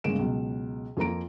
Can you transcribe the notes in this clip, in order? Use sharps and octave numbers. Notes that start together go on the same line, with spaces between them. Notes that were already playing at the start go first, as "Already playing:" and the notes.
G1 C#3 G#3 A#3 D7 E7
C#2 B2 F#3
F2 F3 A#3 A#5 D7